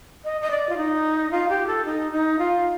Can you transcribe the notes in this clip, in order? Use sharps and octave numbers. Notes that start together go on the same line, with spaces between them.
D#5
D#5
D5
F4
D#4
F4
G4
A4
D#4
D#4
F4